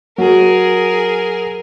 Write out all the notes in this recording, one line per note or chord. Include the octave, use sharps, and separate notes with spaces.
F#3 G#4 A#4